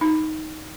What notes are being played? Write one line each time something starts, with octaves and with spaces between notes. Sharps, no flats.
D#4